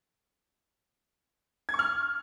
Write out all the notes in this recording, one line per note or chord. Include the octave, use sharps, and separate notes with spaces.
G#6
C#6
F6